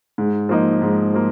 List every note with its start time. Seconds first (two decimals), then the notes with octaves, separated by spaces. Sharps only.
0.18 G#2
0.49 F3 A#3 D#4
0.82 G#2
1.14 F3 A#3